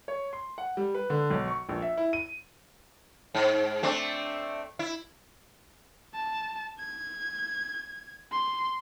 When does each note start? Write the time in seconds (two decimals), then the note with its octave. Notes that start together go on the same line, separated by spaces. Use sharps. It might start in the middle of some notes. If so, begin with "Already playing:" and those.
0.08 C#5
0.33 C6
0.58 F#5
0.77 G3
0.95 B4
1.10 D3
1.30 B1
1.48 C#6
1.69 A#1
1.82 E5
1.97 E4
2.13 D#7
3.35 G#2
3.83 A3 C4 D4
4.79 E4
6.14 A5
6.79 G#6
8.32 C6